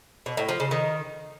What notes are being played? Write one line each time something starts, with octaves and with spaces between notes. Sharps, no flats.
B2
A2
F3
C#3
D#3